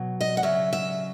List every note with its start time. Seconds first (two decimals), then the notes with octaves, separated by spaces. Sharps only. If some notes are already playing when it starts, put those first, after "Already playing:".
Already playing: B2 F#3
0.21 D#5
0.37 F#5
0.43 C#3 F#3 E5
0.73 E5